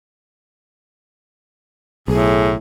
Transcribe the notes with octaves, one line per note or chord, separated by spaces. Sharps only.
B1 A2 G#4